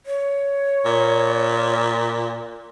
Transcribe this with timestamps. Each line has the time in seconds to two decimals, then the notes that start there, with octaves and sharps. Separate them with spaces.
0.06 C#5
0.85 A#2